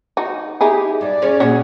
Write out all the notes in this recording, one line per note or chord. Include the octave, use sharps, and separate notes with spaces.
D#4 F#4
D#4 E4 G4 G#4
G2 D5
C#4 G#4 C#5
A#2 C#4 F#4 G#4 C#5